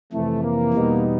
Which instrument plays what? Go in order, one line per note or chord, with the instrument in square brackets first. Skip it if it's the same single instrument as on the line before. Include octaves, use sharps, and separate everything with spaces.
[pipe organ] F2 C3 E3 [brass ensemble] A3
[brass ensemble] A#3
[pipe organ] E2 B2 G3 B3 D#4